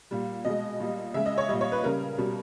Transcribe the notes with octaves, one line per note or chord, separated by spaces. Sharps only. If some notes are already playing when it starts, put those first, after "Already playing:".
A#2 G3
B2 G#3 D#5
A#2 G3
C#3 G#3 E5
D#5
C#5
A#2 G3 D#5
C#5
B4
C#3 G3 A#4
B2 G3